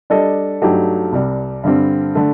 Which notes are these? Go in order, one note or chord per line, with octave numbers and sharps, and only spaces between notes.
G3 D4 A4 D#5
G2 F#3 A3 D#4 G4
C2 C3 G3
G2 D3 G3 C4
D3 A3